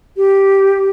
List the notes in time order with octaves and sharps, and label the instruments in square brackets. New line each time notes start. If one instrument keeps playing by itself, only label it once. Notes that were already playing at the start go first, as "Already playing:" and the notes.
[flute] G4